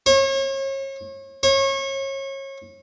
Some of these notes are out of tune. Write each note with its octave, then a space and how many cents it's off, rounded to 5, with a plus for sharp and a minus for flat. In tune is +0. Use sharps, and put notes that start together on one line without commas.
C#5 -35
C#5 -30